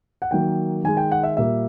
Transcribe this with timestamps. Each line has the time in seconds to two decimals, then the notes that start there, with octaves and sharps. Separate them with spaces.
0.22 F#5
0.31 D#3 F#3 A#3 G5
0.84 D#3 G#3 G#5
0.97 G5
1.12 F#5
1.24 E5
1.37 A#2 G3 A#3 E5